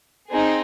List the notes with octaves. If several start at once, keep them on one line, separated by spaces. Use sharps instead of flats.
C4 D#4 G#4